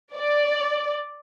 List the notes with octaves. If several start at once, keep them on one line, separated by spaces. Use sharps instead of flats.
D5